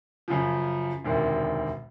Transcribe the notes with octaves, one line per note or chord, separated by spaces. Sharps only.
F#2 C#3 F3
E1 D2 C3 D#3